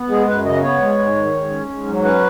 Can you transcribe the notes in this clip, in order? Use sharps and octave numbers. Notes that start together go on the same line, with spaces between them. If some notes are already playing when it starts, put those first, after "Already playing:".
Already playing: B3
G#3 G#4
F#2 B4
C#3 D#5
B3 C#5
G#3
G#2
D#3
G#2
C#4
G#2
F#3
C#4 B4